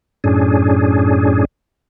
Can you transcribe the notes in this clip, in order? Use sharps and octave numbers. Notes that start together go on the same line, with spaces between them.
F#2 A2 C#4 D4 G#4